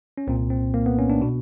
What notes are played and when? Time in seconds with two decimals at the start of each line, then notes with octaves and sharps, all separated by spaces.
0.18 C#4
0.27 C2 A#2 C4
0.50 C4
0.74 A#3
0.86 B3
0.99 C#4
1.10 D4
1.21 B2